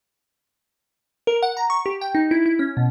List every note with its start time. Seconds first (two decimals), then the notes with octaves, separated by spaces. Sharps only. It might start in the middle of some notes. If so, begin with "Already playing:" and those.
1.27 A#4
1.43 F#5
1.57 A#5
1.70 C#6
1.86 G4
2.01 G5
2.15 D#4
2.31 E4
2.46 E4
2.59 C#4
2.77 B2